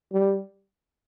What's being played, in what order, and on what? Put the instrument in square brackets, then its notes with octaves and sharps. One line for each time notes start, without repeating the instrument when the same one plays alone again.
[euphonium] G3